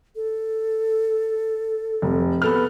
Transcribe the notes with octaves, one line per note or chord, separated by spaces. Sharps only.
A4
F1
B3 A4 B4 F6